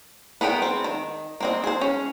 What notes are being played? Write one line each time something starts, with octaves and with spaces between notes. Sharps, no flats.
B3 G#4 A#4 D#5 G5
C4
D#3
A#3 C4 D#5
G#4 C5
C#4